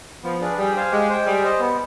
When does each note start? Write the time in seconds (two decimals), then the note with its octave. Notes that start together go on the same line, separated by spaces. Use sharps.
0.23 F3 B3
0.41 D4 G#4 B4 D5
0.57 G3 G#4
0.75 C5 F5 G#5
0.91 G#3 G4
1.10 C5 G5
1.26 G3 G#4
1.43 C5 D#5
1.60 B3